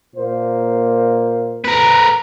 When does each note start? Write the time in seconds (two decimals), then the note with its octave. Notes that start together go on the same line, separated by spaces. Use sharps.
0.15 A#2 A#3 C5
1.64 A#4 B4